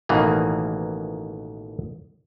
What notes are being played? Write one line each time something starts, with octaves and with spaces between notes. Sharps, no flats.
A1 B2 D#3 E3 A#3